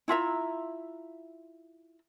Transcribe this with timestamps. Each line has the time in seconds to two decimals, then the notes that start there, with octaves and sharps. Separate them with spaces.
0.08 E4 F4 E5 A#5